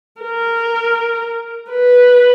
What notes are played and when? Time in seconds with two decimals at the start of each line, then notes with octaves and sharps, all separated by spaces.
0.22 A#4
1.71 B4